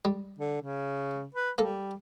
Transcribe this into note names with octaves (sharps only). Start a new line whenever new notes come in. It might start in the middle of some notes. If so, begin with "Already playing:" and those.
G3
D3
C#3
B4
G3 A#3 A4